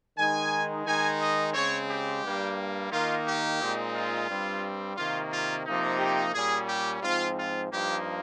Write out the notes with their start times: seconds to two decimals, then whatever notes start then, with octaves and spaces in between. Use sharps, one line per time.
0.17 D#3 G#3 D#4 G#5
0.85 D#3 G#3 D#4 G#5
1.19 D#5
1.53 C#3 G#3 C4 C#5
1.88 G4
2.23 G2 G3 A#3
2.91 D#3 A#3 D#4 F4
3.25 G4
3.59 A#2 G#3 C4 D#4
3.93 F4
4.28 G2 G3 C4
4.96 C3 D#3 A#3 F4
5.31 F4
5.65 C3 F3 A#3 D#4
5.98 G4
6.33 A#2 G3 C#4 G#4
6.67 G4
7.01 G#2 F3 C4 F4
7.36 F4
7.70 G2 F3 A#3 D#4 G4